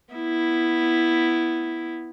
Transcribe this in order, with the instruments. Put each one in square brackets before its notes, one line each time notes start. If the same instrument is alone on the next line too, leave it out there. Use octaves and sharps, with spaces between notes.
[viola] B3 E4